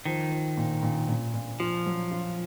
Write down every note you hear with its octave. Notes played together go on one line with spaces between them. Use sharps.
D#3 F3
F3
A#2
A#2
A#2
A#2
F3 F4
F#3
F4